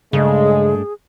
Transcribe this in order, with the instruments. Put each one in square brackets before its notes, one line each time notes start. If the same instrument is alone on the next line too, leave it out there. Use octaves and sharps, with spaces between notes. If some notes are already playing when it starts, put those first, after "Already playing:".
[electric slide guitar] G2 A3 D4 [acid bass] C#3 [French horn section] G#3 [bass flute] G#4